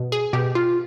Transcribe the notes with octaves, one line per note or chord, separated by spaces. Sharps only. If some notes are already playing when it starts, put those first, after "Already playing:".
Already playing: B2
G#4
B2 G4
F4